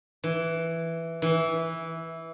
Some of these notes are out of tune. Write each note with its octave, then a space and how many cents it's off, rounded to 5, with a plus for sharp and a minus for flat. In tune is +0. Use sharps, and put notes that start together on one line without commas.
E3 +5
E3 -10